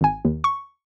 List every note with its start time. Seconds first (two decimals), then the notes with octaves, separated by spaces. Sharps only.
0.01 G#1 G#5
0.25 D#2
0.44 C#6